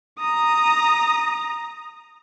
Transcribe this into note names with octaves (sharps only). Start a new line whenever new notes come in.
A#5 D#6